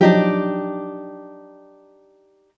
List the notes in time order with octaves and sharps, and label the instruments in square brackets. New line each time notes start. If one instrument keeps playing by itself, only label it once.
[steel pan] F3 F#3 [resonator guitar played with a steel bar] D4 D#4 G4